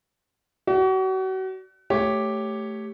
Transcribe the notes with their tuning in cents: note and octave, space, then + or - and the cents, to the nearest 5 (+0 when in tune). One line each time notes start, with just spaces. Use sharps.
F#4 +35 D5 -15
A3 +0 G4 +0 C#5 +0